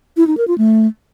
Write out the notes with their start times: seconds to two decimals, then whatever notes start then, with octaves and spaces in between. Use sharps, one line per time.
0.17 E4
0.27 D#4
0.37 A#4
0.48 F4
0.58 A3